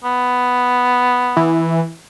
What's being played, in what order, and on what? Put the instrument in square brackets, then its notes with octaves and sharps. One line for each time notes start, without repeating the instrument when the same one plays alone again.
[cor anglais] B3
[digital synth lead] E3